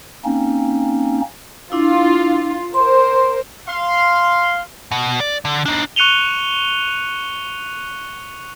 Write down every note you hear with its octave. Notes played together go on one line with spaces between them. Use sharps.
A#3 C4 C#4 D#4
D4 E4 F4
A#4 C5 C6
F5 C6
B2
D5
D3
D4 D#4
C#6 F#6 C#7 D#7 F7 G7